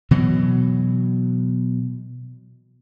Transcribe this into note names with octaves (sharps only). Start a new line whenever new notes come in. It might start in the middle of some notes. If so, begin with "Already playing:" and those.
B2 E3 F#3